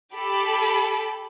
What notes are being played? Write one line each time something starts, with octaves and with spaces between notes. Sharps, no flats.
G4 A4 B5